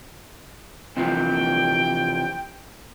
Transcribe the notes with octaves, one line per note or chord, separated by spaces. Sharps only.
C3 E3 F3 G5